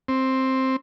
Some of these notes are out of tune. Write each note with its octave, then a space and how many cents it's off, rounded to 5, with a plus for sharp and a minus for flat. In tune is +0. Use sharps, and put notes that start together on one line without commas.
C4 +5